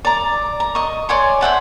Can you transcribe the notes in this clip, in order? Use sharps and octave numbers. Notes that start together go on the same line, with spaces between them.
D5 A#5
A#5
D#5 C#6
C#5 D5 G#5 C6
C5 E5 F#5 A5